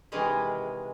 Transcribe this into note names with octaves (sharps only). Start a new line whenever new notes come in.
C3 D#3 E3 G#3